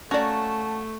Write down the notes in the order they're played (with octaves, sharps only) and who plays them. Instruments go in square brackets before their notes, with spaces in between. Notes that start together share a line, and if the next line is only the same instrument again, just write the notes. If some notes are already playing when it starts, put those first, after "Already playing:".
[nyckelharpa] A3 [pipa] A#3 F#4 [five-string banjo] C#4 D5 [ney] A5